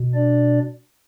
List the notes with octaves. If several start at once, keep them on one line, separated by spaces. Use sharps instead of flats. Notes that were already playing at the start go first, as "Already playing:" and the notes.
Already playing: B2
D4 D5